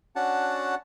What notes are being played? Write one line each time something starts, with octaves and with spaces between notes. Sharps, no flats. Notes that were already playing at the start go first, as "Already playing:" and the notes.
C#4 D4 F#4 F#5 A5